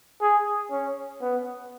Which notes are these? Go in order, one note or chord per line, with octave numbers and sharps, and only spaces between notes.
G#4
C#4
B3